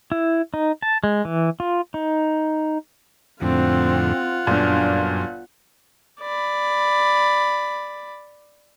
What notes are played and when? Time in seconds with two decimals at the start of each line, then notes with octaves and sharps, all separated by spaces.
0.12 E4
0.54 D#4
0.82 A5
1.04 G#3
1.25 E3
1.60 F4
1.94 D#4
3.42 F2 A2 D3 C4 F4 F#5
4.47 G1 F#2 A#2 D4
6.21 D5 B5